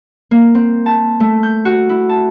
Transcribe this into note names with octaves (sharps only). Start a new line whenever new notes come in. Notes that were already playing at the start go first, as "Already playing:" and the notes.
A#3
C4
A5
A3
G6
F#4
E4
A5